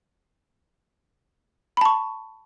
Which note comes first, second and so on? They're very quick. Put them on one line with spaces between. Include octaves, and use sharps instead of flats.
B5 A5 C#6